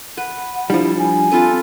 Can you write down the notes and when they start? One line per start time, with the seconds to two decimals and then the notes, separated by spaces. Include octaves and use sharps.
0.17 B4 F#5
0.70 F3 G3 D4 E4
0.99 G#5
1.31 C4 F4 A4 B4